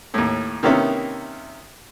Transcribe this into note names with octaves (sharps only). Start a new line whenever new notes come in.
D#2 A2
C3 D#3 A#3 B3 C#4 E4